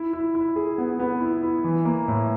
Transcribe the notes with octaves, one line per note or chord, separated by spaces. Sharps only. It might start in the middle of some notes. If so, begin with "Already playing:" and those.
Already playing: E4
E4
E4
G#4
B3
B3
E4
E4
E3
A#3
A2